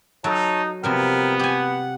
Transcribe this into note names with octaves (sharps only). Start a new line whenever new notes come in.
F#3 D#4 A4 C#5 A5 A#5
C3 F3 G3 B3 A#4 G5 F6
G4 F#5 G#5